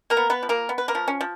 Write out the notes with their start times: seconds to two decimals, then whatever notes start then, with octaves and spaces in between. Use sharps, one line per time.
0.10 A#3 A#4
0.17 B3
0.30 B3 B4
0.43 F3
0.49 A#3 A#4
0.69 B3
0.78 B4
0.88 A#3 A#4
0.95 F3
1.08 C#4
1.21 F3